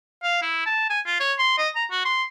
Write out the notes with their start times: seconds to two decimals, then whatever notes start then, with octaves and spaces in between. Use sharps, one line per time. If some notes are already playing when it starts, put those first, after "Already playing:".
0.23 F5
0.42 E4
0.66 A5
0.90 G#5
1.06 F4
1.20 C#5
1.39 C6
1.58 D#5
1.75 A#5
1.91 F#4
2.05 C6